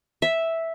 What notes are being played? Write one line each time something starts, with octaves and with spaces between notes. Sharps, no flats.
E5